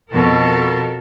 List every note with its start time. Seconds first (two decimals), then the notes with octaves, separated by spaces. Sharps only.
0.11 F2 B2 A4 A#4